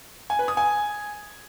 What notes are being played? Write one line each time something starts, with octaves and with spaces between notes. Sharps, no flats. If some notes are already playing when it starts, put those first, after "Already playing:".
G#5
B4
D#6
G#5